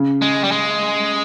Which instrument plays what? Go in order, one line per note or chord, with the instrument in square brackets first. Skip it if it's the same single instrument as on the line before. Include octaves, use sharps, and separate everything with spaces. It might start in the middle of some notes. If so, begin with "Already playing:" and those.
Already playing: [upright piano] C#3
[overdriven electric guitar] G#3
G3
G#3